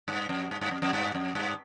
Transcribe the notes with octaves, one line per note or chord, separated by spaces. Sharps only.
G2
F2
G2
G2
F2
F2
G2
F2
G2